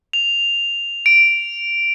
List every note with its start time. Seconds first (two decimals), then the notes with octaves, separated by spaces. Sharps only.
0.13 F7
1.06 D7